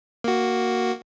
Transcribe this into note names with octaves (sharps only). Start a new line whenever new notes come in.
A#3 F#4